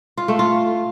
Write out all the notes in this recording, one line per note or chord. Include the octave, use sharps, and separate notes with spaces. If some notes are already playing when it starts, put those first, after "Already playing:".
F4
A3
F4